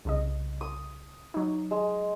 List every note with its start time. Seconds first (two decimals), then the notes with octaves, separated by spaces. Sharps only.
0.05 C2 C#3 D#5
0.61 D#6
1.34 F#3 D#4
1.71 G#3